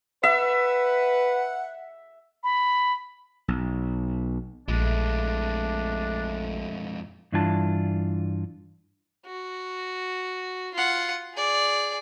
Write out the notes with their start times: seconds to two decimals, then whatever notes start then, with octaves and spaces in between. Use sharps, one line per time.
0.23 B4 E5 F#5
2.44 B5
3.48 B1
4.68 A#1 F2 G#3 A3 D4
7.32 G2 E3 D4 F4 G#5 A5
9.26 F#4
10.74 F4 F#5
11.34 G#4 D5